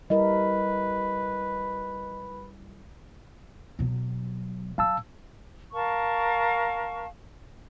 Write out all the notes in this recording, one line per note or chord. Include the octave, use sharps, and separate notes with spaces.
G3 E4 A#4 B4 D#5
B2 F#3
F#3 F5 A5 E6
A#4 F5 A5 C#6